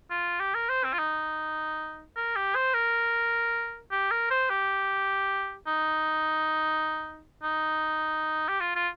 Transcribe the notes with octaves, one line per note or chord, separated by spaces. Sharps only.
F4
G4
A#4
C5
C4
F4
D#4
A#4
G4
C5
A#4
G4
A#4
C5
G4
D#4
D#4
G4
F4
F4